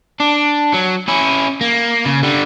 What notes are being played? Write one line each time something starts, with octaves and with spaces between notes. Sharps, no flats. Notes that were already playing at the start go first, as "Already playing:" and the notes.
D4
F#3
C#4 E4
A#3
C#3
D3 G3